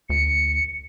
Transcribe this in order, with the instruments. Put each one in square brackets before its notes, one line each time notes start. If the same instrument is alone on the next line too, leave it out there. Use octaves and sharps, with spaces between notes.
[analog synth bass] D2 [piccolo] C#7